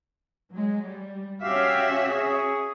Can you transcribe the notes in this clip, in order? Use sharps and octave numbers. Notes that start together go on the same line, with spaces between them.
F#3 G#3
G3
C#4 F#4 G4 E5 F5
G#4 C#6 D#6